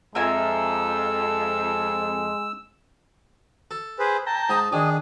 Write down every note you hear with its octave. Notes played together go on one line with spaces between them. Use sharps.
F2 G#3 A#4 E5 G#5 E6
A4
G#4 B4 C5
G5 A5 A#5
G#2 D#6
D#3 D4 G#4 D#5